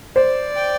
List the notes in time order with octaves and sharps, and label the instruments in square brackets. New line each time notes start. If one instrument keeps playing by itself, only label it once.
[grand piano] C5 [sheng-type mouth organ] D5
[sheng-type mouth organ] G5